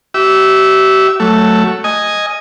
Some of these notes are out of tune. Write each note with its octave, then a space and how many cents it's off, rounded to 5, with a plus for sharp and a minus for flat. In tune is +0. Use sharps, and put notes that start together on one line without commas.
G4 -35 E5 -10
F#3 +0 A3 +5
D#5 +0 G#5 +0